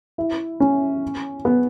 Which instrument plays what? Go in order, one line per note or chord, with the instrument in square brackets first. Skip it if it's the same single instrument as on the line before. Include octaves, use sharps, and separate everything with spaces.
[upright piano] E4
C#4
B3